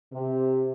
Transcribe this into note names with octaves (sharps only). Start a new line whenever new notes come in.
C3